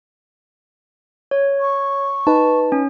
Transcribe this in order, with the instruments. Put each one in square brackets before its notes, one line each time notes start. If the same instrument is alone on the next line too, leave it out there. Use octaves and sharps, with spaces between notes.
[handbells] C#5
[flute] C#6
[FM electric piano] D#4 B4 [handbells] A5
[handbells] C#4